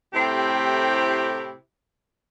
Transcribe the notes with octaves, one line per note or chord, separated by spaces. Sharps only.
A2 C3 A3 C4 E4 G4